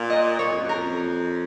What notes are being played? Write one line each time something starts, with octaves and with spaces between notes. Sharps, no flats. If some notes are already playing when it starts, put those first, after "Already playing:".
Already playing: A#2 F5
D#5
A#2 C#5
F2
F#2
A#4
F2